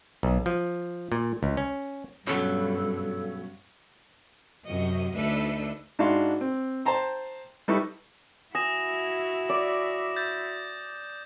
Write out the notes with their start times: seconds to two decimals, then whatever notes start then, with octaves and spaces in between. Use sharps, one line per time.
0.23 B1
0.46 F3
1.12 A#2
1.43 C#2
1.57 C#4
2.27 G2 B2 F#3 C#4 A4
4.64 F#2 C3 F#4 D#5
5.14 D2 D4 D#4 A4 B4 E5
5.99 G#2 D4 E4 F#4 F5 C6
6.41 C4
6.86 C5 G5 A5 A#5 C6
7.68 G3 D#4 E4 A4 B4 C#6
8.55 E4 F#4 G#5 D#6 A#6 E7
9.49 D5
10.16 G6 A6